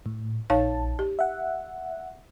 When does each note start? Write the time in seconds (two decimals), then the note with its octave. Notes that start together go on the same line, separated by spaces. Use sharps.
0.06 A2
0.50 A#1 D#4 C#5 F5 A5
0.99 G4
1.19 E5 F#5